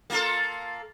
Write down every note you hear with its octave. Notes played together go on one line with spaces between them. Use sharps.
A#3 F4 A4